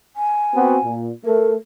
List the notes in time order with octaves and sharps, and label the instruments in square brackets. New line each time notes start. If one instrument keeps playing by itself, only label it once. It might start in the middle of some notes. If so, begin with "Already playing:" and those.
[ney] G#5
[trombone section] B3 C4 F#4
A#2
[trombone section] A3 [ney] A#4